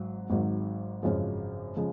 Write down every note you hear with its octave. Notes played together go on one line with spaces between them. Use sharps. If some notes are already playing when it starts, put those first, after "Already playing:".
Already playing: G#1 G#2 F#3
G#1 G#2 D#3 F#3
G#1 F#2 C#3 F3 G#3
C#3 F3 G#3